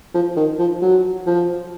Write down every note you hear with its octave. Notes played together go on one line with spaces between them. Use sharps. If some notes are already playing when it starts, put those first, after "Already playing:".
F3
D#3
F3
F#3
F3